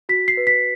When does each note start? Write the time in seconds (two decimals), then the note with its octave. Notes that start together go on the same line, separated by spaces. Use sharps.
0.09 F#4 B6
0.28 C7
0.37 B4
0.47 B6